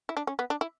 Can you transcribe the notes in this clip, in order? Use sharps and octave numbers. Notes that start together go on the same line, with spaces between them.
E4
D4
C#4
B3
D4
E4